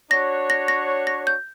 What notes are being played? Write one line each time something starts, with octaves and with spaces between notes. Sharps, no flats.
D4 F#4 C#5 A#6
A#6
A#6
A#6
G6